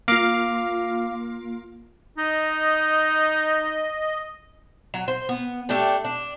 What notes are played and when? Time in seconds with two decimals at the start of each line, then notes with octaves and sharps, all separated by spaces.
0.08 A#3 F4 F5 D6
2.18 D#4 D#5
4.94 F#3
5.08 C5
5.29 B3
5.69 A3 D4 G4 A4
6.05 D4